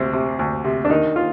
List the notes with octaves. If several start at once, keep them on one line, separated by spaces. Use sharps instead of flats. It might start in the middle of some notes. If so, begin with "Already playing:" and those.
Already playing: D2 C3 C4
C3
D2
C3
D4
D#3 D#4
F4